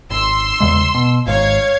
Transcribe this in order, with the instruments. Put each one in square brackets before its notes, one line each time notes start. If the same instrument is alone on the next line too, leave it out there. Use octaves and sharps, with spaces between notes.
[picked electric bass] G#1 [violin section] C6 E6
[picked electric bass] E2 C#3 G#3
B2
[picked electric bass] G#1 G#2 [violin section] C#5 F5 G#6